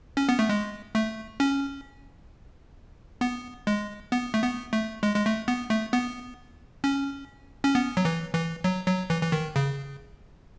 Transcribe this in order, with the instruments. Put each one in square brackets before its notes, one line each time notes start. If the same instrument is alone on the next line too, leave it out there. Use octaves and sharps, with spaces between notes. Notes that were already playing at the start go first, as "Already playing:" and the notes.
[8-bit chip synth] C#4
B3
A3
G#3
A3
C#4
B3
G#3
B3
A3
B3
A3
G#3
G#3
A3
B3
A3
B3
C#4
C#4
B3
F#3
E3
E3
F#3
F#3
E3
E3
D#3
C#3